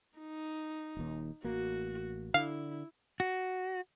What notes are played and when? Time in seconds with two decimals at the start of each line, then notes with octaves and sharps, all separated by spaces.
0.18 D#4
0.97 D#1 D#2
1.44 A1 A#3 F#4
2.34 D3 E4 F5
3.20 F#4